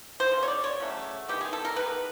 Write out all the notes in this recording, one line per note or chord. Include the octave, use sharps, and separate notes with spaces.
C5
C#3 F#3
C#5
D5
C#5
C#3 F#3 A3
D#3 G#3 B3 G4
G#4
A4
A#4
D#3 G#3 B3 B4